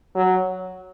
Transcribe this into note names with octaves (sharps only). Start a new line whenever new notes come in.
F#3